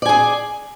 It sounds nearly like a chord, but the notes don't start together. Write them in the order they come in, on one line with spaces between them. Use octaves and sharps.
D5 G#5 G#4